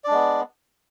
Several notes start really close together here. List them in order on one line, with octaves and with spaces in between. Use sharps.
D5 D4 G#3 B3